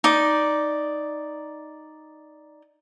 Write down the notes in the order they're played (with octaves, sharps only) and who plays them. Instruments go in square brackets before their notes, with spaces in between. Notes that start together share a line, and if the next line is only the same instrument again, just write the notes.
[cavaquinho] D#4 D5